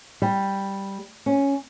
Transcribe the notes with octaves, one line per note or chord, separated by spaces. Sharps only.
G3
C#4